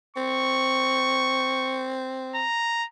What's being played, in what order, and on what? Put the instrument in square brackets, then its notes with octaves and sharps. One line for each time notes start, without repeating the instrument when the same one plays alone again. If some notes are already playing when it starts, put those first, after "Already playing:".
[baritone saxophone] C4 [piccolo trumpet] C#6
[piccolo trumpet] A#5